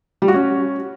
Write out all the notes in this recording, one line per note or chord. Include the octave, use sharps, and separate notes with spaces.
G3
F#4
C#4